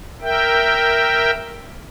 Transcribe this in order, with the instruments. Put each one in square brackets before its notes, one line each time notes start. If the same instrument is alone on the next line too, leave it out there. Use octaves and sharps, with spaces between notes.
[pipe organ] A#4 E5 G5